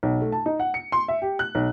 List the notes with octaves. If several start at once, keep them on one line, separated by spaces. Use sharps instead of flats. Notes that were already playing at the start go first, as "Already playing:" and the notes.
B1
A3
A5
D#4
F#5
C#7
C6
E5
G4
F#6
B1